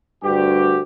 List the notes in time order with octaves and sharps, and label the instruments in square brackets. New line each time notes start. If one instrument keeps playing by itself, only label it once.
[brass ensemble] D2 G2 F#4 G4